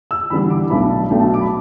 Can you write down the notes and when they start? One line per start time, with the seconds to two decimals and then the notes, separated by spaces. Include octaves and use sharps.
0.11 E6
0.30 E2 D3 G3 D4 B5
0.50 D6
0.70 B1 B2 A3 D4 B5
0.90 A5
1.11 B1 B2 A3 D4 G5
1.20 A5
1.34 D6
1.41 B5